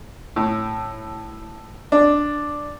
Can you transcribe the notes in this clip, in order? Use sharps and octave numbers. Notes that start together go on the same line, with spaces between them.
A2
D4